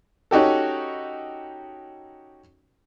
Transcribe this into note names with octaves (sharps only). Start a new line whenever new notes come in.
C#4 D#4 F#4 G4 A4